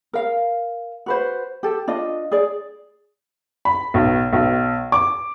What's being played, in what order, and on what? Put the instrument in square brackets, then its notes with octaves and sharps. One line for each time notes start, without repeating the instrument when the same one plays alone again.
[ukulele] A#4 F5
F#4 B4 C5
G4 A4
D4 F4 D#5
G#4 D5
[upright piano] B5
B1
B1
D6